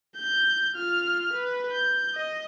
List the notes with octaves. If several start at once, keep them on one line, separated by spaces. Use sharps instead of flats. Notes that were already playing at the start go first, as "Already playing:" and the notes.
G6
F4 F6
B4
G6
D#5